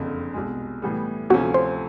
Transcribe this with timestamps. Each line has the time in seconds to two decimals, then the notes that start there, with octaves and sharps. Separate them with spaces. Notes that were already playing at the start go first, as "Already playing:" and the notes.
Already playing: F#1 F2 D3
0.34 C2 B2 G#3
0.82 A2 E3 G3 B3
1.30 D2 C3 F3 A3 C#4 F#4
1.54 C5